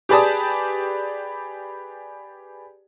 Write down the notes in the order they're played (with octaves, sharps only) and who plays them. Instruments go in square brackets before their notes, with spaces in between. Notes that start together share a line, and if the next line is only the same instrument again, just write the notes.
[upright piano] G4 G#4 B4 D5 A5 D#6